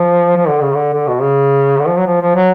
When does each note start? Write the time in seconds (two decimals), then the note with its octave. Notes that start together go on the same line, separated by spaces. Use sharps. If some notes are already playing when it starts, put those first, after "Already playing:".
Already playing: F3
0.36 F3
0.48 D3
0.62 C#3
0.74 D3
0.93 D3
1.07 B2
1.21 C#3
1.79 D3
1.88 F3
1.98 F#3
2.07 F3
2.21 F3
2.36 F#3